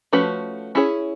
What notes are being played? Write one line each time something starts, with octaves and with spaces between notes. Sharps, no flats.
F3 A3 C#4 F#4 B4
C#4 E4 G#4 C#5